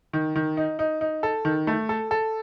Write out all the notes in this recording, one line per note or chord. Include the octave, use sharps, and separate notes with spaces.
D#3
D#3
D#4
D#4
D#4
A4
D#3
A3
A4
A4